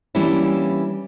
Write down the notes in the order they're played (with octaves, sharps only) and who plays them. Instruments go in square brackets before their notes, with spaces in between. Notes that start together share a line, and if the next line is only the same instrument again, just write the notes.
[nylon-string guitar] E3 G3 A#3 C#4 D4 E4